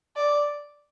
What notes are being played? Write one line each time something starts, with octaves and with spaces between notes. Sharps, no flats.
D5